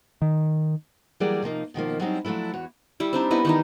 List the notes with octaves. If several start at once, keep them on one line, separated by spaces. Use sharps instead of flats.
D#3
E3 F#3 G3 A#3 G#4 D5
C3 F3 A#3 D#4
B2 D#3 F3 A#3
F#3 G3 C4 C#4 D#4 E4
F3 F#3 A3 D4 E4
E2 F#4 C#5
G3 E4
C4 D4 D#4
B3 E4 D#5
D#3 E3 D#4